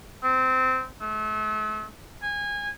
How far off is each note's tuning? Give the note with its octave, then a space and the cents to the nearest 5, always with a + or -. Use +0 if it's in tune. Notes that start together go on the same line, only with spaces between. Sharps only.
C4 -15
A3 -40
G#5 -25